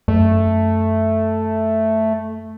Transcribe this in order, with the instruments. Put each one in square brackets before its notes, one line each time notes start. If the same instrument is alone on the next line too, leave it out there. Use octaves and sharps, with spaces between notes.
[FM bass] F#2 [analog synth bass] A3